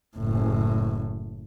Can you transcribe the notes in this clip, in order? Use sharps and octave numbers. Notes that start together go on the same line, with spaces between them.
F#1 A2